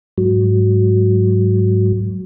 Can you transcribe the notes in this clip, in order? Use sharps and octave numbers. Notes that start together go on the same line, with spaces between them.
G#2 F#3